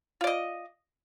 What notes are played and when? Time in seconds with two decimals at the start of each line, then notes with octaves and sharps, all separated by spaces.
0.21 F4
0.24 D5
0.27 D#5